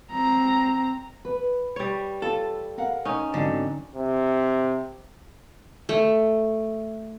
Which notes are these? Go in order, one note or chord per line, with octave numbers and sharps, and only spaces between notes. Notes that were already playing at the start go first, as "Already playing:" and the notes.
C4 A#5
B4
G3 C#5
F4 A4
A#4 F5 F#5
C#4 D#4
G#2 D3 F#3 C4
C3
A3